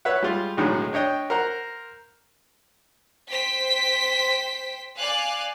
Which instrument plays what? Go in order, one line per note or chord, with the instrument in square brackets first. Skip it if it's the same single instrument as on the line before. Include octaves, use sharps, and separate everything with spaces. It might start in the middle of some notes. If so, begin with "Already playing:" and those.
[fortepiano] B4 C#5 E5 F#5
G3 G#3 F4
B1 A2 D3 D#3 F#3 G#3
D4 C#5 D#5 G5
A#4 C5 F#5 A#5
[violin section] C5 G5 B6
D5 F5 G#5 F#6